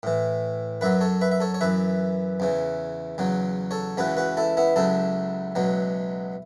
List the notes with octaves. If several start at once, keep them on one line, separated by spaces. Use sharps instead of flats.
A2 E3
F#2 F#3 B4 E5
A4 C#5
B4 E5
E5
A4 C#5
C#5
F#2 E3 B4 E5
E2 C#3 E3
E2 C#3 F#3
A4 C#5
C#2 C#3 E3 F#4 B4
F#4 B4
E4 A4
B3 E4
C#2 C#3 F#3 E4 A4
C#2 B2 F#3